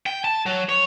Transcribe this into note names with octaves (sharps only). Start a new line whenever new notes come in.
G5
A5
F#3
C#5